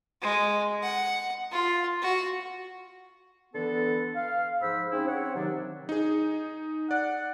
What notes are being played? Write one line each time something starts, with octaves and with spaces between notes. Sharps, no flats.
G#3
F#5
F4
F#4
D3 E3 B3 A4 B4
F5
G#2 F3 C5 B5 E6
C4 C#4 D#4 E4 G#4
C4 C5 C#5 F#5
C3 D#3 F#3 D4 D#4
D#4 G#4
D5 F#5